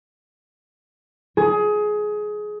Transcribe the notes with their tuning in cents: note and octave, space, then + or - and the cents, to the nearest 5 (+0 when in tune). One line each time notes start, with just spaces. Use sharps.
G#4 +20